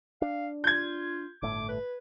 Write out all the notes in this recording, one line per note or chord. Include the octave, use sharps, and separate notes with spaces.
D4 F5
F4 G6 G#6
G1 A2 A3 D6
B4